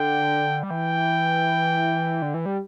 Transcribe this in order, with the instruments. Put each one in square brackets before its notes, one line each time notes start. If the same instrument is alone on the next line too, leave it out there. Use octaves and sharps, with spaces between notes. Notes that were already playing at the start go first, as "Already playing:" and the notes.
Already playing: [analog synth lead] D3 [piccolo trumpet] G5
[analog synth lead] G3
[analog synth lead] E3 [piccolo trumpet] G5
[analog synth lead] D3
E3
G3